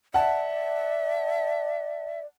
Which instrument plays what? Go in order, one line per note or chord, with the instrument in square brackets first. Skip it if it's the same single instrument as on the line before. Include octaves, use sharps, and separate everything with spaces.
[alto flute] D5 [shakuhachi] E5 [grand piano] F#5 A5